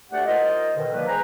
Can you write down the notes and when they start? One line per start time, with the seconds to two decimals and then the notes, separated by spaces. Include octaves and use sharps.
0.11 D2 A3 G4 D5 F#5
0.26 D#4 F4 A#4 C5 D#5
0.76 B2 D3 D#3
0.92 D#3 F3 G3 A#3 B4
1.07 G#4 B4 C5 G#5 A#5